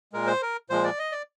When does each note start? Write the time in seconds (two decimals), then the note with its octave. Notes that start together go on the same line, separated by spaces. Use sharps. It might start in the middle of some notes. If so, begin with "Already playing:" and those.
0.13 A#2 G#3 A#4
0.27 C5
0.42 A#4
0.70 A#2 F3 G#3 C5
0.84 D5
0.99 D#5
1.12 D5